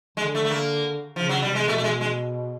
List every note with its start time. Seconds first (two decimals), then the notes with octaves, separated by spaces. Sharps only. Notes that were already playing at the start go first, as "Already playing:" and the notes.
0.17 D3 G#3
0.35 A3
0.45 A3
0.50 A#3
1.16 C#3 F3
1.29 F#3
1.42 C3 G3
1.55 G#3
1.67 B2 A3
1.78 A3
1.84 G#3
2.01 G#3